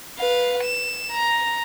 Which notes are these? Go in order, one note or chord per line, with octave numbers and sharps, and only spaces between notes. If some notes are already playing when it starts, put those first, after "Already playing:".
B4 F5
E7
A#5